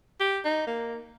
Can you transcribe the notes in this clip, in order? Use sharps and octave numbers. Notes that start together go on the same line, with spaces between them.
G4
D#4
A#3